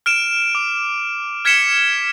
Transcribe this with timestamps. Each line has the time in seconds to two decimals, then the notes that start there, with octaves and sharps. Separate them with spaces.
0.06 F6 D7 E7
0.55 D6
1.45 F6 G#6 B6 C#7 E7 G7